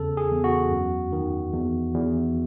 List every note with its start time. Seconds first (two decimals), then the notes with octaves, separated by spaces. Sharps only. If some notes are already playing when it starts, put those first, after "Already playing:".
Already playing: E2 C#3 A4
0.17 G#4
0.31 E2
0.44 F#4
0.71 F#2
1.12 D#3
1.53 E2
1.94 E2